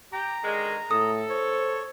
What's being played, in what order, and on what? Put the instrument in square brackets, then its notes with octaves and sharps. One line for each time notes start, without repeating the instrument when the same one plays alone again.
[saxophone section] G4 [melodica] A#5
[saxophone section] D3 D#3 G#3
[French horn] A2 [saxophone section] A4 [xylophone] D#6
[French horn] C5 [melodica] C#5